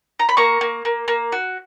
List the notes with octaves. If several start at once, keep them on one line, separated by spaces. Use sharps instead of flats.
A#5
B5
A#3 A#5 C#6
A#3
A#3
A#3
F#4